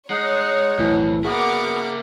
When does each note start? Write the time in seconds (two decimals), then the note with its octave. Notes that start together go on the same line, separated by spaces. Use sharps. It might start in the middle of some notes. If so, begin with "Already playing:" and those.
0.10 G#3 D#4 C#5 F#5
0.78 B1 F2 A2 E3
1.25 A#3 B3 E4 F#4 G#4 A#4 F#5 D6